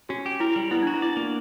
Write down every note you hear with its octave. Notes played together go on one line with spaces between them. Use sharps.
C#4 F#4
G4
E4 A#4
G3
B3 E4
D4 F#4
E4
D5
A#3